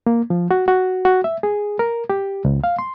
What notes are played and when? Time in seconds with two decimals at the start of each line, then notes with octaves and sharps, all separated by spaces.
0.07 A#3
0.30 F3
0.51 F#4
0.68 F#4
1.05 F#4
1.24 E5
1.43 G#4
1.79 A#4
2.10 G4
2.45 C#2
2.64 F5
2.79 C6